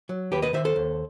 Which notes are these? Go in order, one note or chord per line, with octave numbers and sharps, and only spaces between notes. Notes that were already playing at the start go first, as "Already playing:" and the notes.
F#3
D#2 G4 B4
B4 D#5
D#3 C5 E5
A4 C5
D#2